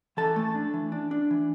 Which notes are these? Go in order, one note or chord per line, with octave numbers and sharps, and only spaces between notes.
E3 A4 A5
A3
D4
E3
D4
D4
E3